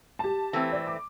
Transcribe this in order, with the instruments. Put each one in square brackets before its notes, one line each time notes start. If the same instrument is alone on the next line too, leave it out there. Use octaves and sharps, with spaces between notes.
[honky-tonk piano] G4 A5
[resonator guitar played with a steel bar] E3 A3 C4
[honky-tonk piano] D5
D6